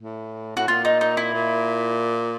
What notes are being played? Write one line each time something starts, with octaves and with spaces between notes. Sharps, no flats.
A2
A2 F#4
A#2 F4
D#4
D#4
E4
A#2